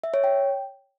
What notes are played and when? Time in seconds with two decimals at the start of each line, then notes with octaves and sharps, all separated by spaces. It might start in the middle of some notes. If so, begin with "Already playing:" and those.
0.04 E5
0.14 C#5
0.24 G5